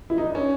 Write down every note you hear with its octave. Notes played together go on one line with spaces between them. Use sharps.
E4
D#4
D4
C#4